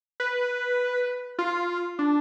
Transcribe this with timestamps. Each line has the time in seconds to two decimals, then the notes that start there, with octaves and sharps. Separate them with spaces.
0.20 B4
1.38 F4
1.99 D4